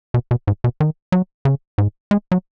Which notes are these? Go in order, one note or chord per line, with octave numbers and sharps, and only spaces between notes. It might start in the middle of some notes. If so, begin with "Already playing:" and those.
B2
B2
G#2
B2
D#3
F#3
C#3
G#2
G#3
F#3